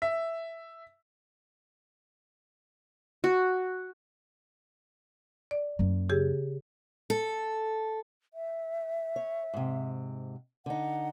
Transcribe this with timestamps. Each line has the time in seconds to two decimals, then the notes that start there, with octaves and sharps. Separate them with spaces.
0.02 E5
3.24 F#4
5.51 D5
5.79 F#2 A#3
6.09 C#3 G4 G#4
7.10 A4
8.34 E5
9.16 C#5
9.54 G#2 C3
10.66 D3 D#4 F#5